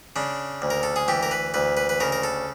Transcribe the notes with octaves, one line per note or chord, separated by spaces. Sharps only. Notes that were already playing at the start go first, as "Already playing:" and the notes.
C#3 D4
D2
A#4
A4
G#4
E3 G4
A#4
B4
D2 B4
B4
B4
C#3 A#4
A#4
A4